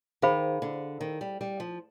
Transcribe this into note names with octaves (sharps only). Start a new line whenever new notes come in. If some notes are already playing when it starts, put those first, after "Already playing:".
D#3 G#4 C5 F5 B5
D3
D#3
G3
G3
F3